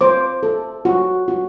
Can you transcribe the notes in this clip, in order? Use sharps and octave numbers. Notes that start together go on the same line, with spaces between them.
C5 D6
A4
F#4
F#4